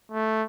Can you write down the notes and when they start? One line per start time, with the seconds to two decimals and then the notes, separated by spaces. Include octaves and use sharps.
0.12 A3